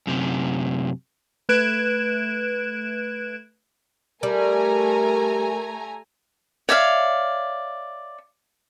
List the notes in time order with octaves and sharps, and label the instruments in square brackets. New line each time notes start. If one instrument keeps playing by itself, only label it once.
[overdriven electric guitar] F#2 C3
[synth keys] A3 B4 F#6 G#6 D7 E7
[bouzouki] G3 [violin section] A3 G#5 A#5 [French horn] A#4
[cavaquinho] C#5 D5 E5 F5